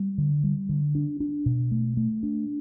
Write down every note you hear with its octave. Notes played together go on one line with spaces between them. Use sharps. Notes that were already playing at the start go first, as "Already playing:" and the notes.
Already playing: G3
D3
G3
D3
D4
D4
B2
A3
A3
D4